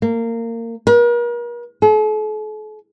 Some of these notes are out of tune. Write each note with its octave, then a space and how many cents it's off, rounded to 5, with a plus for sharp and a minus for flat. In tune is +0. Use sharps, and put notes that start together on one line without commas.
A#3 -25
A#4 +40
A4 -45